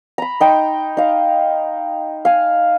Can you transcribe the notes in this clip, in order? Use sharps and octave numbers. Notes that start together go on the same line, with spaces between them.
A#5 B5
D#4 G5 C6
D#4 F5
F5 G#5